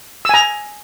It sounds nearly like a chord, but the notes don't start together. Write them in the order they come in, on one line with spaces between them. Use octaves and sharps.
E6 G#5 A#5